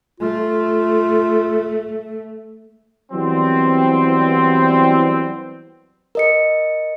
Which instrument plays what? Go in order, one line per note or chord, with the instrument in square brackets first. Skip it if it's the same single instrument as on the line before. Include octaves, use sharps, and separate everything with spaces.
[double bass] A3 [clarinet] F4
[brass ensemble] E3 F#3 G3 B3 C4
[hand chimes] A#4 D#5 C#7